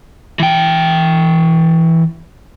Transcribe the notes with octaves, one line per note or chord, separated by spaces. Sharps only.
E3 G5